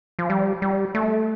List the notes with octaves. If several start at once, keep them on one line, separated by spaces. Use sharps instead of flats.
F3
G3
G3
A3